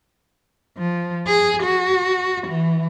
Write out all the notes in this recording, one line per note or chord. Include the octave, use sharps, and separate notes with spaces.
F3
G#4
F#4
E3